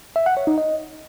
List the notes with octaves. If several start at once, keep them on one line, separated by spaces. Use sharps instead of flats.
E5
F#5
C#5
D#4
D#5